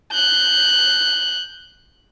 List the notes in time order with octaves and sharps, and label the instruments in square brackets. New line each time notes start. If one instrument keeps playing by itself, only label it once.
[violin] F#6 G6